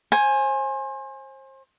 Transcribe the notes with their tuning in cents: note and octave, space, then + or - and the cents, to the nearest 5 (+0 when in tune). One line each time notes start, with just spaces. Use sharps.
C5 +35 G#5 +0